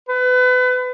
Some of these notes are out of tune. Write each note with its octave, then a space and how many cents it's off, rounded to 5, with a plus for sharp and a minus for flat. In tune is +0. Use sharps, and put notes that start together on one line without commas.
B4 +30